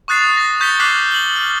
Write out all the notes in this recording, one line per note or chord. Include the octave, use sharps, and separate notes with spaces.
C#6 D#6 F#6 A6 C7 E7
A#6
C#6 G6 A6 B6 C#7 G7
D6 F6 F#6 B6 C7 F#7
F#7 G7
F6 F#7